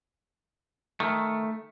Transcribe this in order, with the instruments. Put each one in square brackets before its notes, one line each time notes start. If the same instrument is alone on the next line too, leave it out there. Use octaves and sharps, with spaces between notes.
[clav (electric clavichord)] D#3 [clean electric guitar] A3